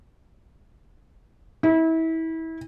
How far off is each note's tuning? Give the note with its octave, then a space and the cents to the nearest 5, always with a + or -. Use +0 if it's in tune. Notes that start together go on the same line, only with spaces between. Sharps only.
E4 -30